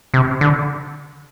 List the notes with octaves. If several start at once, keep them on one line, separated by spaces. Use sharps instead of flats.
C3
D3